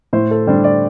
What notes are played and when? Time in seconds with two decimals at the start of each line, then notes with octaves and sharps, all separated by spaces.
0.13 A2 C5
0.31 A4
0.47 G3 D4 C5
0.64 D5